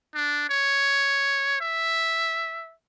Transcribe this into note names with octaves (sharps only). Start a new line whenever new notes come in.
D4
C#5
E5